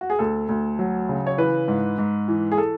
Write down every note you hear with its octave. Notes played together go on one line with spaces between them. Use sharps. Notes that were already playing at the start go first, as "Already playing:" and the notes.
F#4
G#4
D2 A4
D2
F#3
C#3
C#5
E3 B4
G#2
G#2
E3
G#4
A4